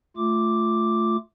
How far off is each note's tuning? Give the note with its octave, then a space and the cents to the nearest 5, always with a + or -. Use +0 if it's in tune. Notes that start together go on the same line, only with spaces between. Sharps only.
A3 +0 F4 +0 D6 +0